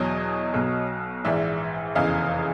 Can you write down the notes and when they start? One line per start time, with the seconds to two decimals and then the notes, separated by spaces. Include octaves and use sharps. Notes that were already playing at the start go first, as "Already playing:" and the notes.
Already playing: E2 B2 F#3 C#5 D#5
0.54 B1 B2 F#3
1.25 A#1 G#2 E3 D5 E5
1.95 F1 E2 C#3 E3 D#5 F5